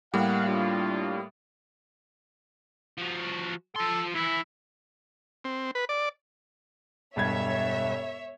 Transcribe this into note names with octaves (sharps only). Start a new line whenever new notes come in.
A2 G3 A#3 G4 F5 F#5
D4 F4
F3 F#4
F3 A4 C6
E3 E4
C4
B4
D5
E1 G2 C#5 E5 G#6